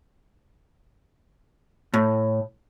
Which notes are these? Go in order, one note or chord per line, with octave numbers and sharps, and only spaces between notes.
A2